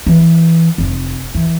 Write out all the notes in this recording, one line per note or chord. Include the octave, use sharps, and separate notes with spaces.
E3
F1
E3